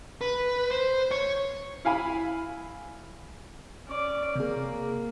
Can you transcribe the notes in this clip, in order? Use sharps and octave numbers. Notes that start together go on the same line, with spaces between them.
B4
C5
C#5
E4 F5 G#5 B5
C#4 D5
C3 A#3 G#4